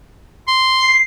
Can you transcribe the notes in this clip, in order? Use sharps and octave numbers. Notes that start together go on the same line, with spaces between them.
C6
C7